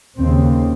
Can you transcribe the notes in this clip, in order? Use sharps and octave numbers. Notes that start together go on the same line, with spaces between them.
D#2 C#3 C4